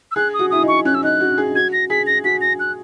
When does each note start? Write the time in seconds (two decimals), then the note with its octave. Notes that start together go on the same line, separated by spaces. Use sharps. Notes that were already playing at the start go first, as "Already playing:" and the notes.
0.11 E6
0.16 G#4 F#6
0.34 D#6
0.39 F#4
0.51 E4 D#6
0.63 D#4
0.68 C#6
0.85 C#4 F#6
0.95 E6
1.03 D#4 F#6
1.20 F#4
1.38 G#4
1.55 F#4 G#6
1.73 A#6
1.90 G#4 B6
2.07 A#6
2.24 F#4 B6
2.41 A#6
2.60 F#6